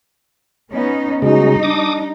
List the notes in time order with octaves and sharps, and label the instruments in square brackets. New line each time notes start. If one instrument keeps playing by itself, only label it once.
[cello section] B3 C#4 D#4
[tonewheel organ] C#3 G#3 [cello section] G3 D#4 [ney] F#4
[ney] D4 [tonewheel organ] D6 D#6